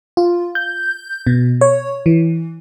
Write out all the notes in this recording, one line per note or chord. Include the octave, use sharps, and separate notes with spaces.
F4
G6
B2
C#5
E3